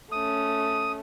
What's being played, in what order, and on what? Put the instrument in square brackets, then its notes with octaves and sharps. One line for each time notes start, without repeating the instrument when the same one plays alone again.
[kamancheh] A3 C#4 [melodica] D#6